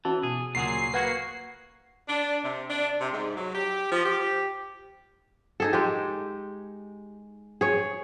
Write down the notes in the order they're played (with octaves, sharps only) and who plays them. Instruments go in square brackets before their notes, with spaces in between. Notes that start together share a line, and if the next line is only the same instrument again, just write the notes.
[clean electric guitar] E3 [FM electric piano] C#4 F#4 A5
[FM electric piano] B2 [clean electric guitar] G#4
[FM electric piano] D2 C#3 F#5 [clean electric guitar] A#2 F#3 G#4 [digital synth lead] C7
[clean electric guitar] A#3 F#4 [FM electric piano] B4 F#5 G#6
[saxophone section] D4
C3
D4
C3
G#2
F#3
G4
F3
G4
[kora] D#4 G#4 A4
G#3 G4
G#4 C#5